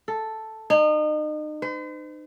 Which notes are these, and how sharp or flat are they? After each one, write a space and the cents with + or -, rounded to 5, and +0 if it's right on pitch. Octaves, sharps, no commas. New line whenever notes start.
A4 +0
D#4 -35
C5 -45